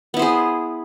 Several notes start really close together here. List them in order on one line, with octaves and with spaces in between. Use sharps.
B3 E4 C5 G#4